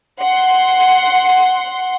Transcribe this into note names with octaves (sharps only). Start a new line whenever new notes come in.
F#5 C6